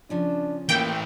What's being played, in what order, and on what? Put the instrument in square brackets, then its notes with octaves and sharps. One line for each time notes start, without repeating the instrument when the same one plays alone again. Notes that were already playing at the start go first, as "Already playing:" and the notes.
[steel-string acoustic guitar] C#3 F3 C#4 [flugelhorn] D4
[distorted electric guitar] A2 E3 [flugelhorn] A#3 [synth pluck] G5